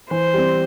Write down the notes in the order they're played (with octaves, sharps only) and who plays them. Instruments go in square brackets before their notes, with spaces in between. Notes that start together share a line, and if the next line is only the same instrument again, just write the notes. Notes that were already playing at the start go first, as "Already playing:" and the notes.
[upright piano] E3 [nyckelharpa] C5
[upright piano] G3 C4